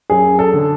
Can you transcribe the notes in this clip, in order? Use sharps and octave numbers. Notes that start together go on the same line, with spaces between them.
F#2 G#4
A4
D3